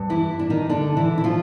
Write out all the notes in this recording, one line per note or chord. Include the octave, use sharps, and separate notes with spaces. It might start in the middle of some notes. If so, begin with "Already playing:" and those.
Already playing: G2
E3 E4
D4
D#3 D#4
D3 D4
E3 E4
E4
F3 F4